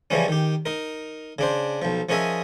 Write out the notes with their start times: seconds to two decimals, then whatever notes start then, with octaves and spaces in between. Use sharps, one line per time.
0.10 C#3 E3 F3 G3 C#4
0.28 D#3 G4
0.66 D#4 A#4
1.39 C#3 D4 C5
1.82 B1 F3
2.09 F3 C#4 G#4 A#4 D#5 E5